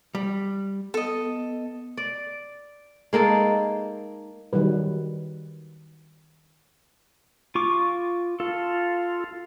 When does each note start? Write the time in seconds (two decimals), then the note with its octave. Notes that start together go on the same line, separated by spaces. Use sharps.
0.15 G3
0.94 B3 A4 D#5
1.97 D5
3.13 G#3 A#3 D#4 A4
4.53 D#3 F#3 G3 B4
7.55 F4 C#6 D6
8.40 F4 A4